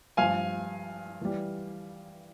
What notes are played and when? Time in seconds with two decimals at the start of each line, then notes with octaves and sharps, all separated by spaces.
0.17 G2 F3 F5 G#5
1.21 E3 G3